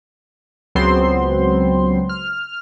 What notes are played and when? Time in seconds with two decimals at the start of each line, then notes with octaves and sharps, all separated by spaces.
0.75 C#2 F#3 B3 C4 C5 C6
2.09 F6